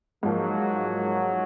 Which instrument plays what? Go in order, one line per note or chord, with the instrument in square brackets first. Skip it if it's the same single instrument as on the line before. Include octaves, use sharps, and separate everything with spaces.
[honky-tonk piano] G#2 F3 A#3 [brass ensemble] F#3